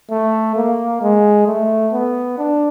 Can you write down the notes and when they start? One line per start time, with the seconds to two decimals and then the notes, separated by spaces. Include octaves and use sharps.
0.11 A3
0.56 A#3
1.02 G#3
1.47 A3
1.93 B3
2.38 D4